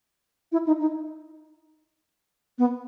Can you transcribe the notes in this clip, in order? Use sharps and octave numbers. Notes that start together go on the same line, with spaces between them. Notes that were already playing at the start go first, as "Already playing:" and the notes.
E4
D#4
D#4
B3